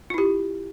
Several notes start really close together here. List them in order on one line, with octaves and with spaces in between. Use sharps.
F4 E4 G4